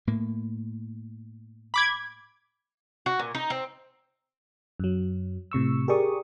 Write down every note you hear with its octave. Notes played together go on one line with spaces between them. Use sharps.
A2 A#3
B5 D6 G#6
F#4
A#2
D#4
C4
F#2 F#3
A2 C3 C#6 E6
G4 G#4 A#4 D5 C#6 D#6